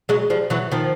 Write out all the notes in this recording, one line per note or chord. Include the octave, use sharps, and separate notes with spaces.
F#3 G#3
F3 G3
E3 F#3
D#3 F3